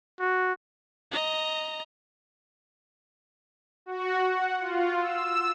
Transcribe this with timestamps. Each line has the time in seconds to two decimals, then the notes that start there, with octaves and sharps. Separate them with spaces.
0.20 F#4
1.12 D#5 A#5
3.86 F#4
4.20 F#5
4.59 F4
4.98 E6